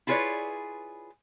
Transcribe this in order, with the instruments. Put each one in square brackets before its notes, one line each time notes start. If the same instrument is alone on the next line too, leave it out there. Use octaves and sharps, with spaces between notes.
[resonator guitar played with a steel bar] E4 F4 G#4 B4 C#5 D5